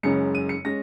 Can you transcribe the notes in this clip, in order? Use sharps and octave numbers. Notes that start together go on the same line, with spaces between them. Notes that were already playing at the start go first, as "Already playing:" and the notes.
F#1 F#2 C#3 G#3 C#4 C#7
D#7
C#7
G#3 C#4 A#6